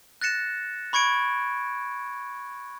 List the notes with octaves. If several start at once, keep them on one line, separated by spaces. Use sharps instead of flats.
F#6 A6 A#6 C#7 E7
B5 C#6 G#6 C#7 D7